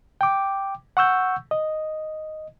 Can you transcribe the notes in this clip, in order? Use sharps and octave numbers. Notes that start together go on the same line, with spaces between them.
G5 D6
F#5 C#6 E6 G6
D#5